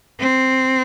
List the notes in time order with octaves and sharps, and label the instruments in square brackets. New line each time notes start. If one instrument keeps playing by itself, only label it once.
[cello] C4